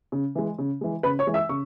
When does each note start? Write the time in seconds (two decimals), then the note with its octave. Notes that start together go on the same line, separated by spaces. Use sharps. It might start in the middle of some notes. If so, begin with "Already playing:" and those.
0.12 C#3
0.35 E3 G#3
0.59 C#3
0.81 E3 G#3
1.03 C#3 B4 B5
1.19 C#5 C#6
1.27 E3 G#3
1.34 E5 E6
1.49 C#3 C#6